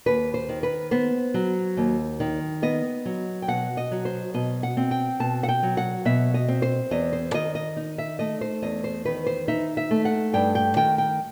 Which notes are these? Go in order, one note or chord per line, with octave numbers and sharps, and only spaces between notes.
D#2 B4
C5
D#3
B4
B3 C5
F#3
D#2
D#3
B3 D#5
F#3
G5
B2 F#5
D#5
F#3
C5
B2 D#5
F#5
C4
G5
B2 A5
F#5
G5
F#3
F#5
B2 E5
D#5
C4
C5
E2 D#5
C5
D#3 D#5
D#5
D#4
E5
A3 D#5
C5
E2 D#5
C5
D#3 B4
C5
D#4 E5
E5
A3
F#5
G2 G5
G5
D#3 G5
G5